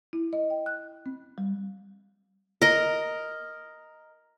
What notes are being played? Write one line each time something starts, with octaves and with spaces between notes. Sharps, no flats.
E4
D#5
G5
F#6
C4
G3
A#4 D#5